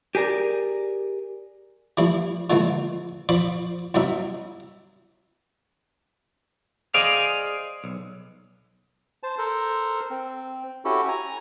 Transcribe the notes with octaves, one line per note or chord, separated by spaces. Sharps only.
G4 G#4 A#4 D5
E3 F3 G3 A3 E4
A#2 D3 E3 F3 G#3 A3
F3 C5 D5 B5 C#6
C2 G2 F#3 C#4 D#4 E5
G#4 C5 D5 D#5 F5
B1
C5 A5
A4 A#4 C5
C4
C#4 E4 F#4 G4 A4
G#5 A#5